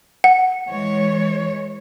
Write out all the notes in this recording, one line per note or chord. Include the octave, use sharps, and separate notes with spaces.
F#5
E3 G#3 C#5